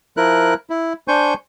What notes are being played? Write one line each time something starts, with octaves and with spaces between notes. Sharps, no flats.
F3 E4 A#4 F#6
E4
D4 C5 G#5 C#6 G6